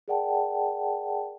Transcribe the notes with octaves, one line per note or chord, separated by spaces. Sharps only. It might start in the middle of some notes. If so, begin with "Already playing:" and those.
G#4 A#4 D5 F#5 G5 A5